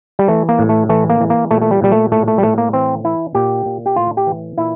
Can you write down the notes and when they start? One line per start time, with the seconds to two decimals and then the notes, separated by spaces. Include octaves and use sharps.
0.19 G3
0.28 E3 A3
0.49 A#3
0.59 A2
0.69 A3
0.89 E3 A3
1.10 A#3
1.20 E3
1.30 A#3
1.51 A#2 A3
1.62 A3
1.71 G3
1.82 A#2 G3
1.92 A3
2.12 A2 A3
2.28 A3
2.38 G3
2.43 A2 A3
2.58 A#3
2.73 E3 C4
3.04 E3 E4
3.35 A#2 G4
3.66 A#2
3.86 G4
3.96 A2 F4
4.17 G4
4.27 E3
4.58 A#2 E4